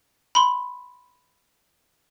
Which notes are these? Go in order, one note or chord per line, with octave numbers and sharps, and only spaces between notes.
B5 C6